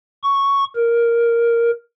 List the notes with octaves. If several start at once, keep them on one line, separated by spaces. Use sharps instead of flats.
C#6
A#4